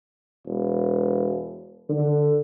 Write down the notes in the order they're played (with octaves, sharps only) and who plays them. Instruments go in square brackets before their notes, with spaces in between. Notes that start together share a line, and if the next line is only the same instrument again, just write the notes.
[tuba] E1
D3